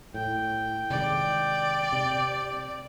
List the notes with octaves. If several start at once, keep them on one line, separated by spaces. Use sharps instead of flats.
A2 G5
C3 D#3 G#3 D5
C3